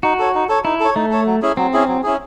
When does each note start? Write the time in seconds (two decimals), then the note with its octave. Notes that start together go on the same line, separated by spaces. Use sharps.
0.03 D#4 F#4
0.19 A4 C#5
0.34 D#4
0.49 A4 C#5
0.65 D#4 E4
0.80 A4 C#5
0.96 A3 D#4
1.11 A4 C#5
1.26 F#3
1.42 C#4 E4 G#4
1.57 F#3 C4
1.73 C#4 E4 G#4
1.88 F#3
2.04 C#4 E4 G#4